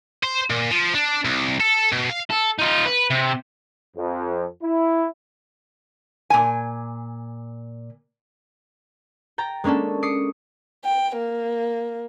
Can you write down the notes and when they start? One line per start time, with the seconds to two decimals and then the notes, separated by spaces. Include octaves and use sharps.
0.23 C5
0.50 A#2
0.71 F3
0.95 D4
1.25 C2
1.60 A4
1.92 B2
2.10 F5
2.31 A4
2.59 D#4 F4
2.85 B4
3.10 C3
3.96 F2
4.63 E4
6.30 A#2 G#5
9.38 G5 A#5 A6
9.64 G#3 A#3 C#4 D4 A4
10.03 D6 D#6 C7 C#7
10.85 G5
11.17 A#3